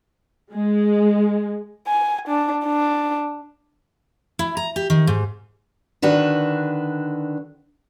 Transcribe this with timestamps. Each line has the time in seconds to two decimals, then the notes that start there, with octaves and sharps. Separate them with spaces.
0.53 G#3
1.87 G#5
2.28 D4
2.65 D4
4.39 E4
4.57 A#5
4.76 G4
4.90 D#3
5.07 G#2
6.02 D3 D#3 D4 F#4 B4